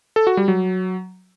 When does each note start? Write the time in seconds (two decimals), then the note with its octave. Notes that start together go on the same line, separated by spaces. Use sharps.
0.16 A4
0.27 F#4
0.37 G3
0.48 F#3